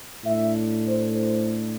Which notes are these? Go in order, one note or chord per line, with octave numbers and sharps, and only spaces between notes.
A2 A3 D4 E5
C5
C5